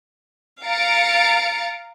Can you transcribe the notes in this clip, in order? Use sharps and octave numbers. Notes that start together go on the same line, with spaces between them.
F5 A#5 A6 C#7 D7